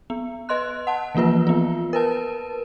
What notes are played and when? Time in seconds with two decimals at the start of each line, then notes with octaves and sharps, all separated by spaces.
0.10 B3
0.49 B4 D#5 C6 F#6
0.87 F#5 A5
1.15 E3 F3 A#3 F4 B4
1.47 B3 F4
1.93 A#4 B4 A5